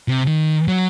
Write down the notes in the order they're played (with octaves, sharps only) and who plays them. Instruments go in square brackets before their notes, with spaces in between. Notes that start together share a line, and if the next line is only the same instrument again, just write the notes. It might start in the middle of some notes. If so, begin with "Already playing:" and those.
[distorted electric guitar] C3
D#3
F#3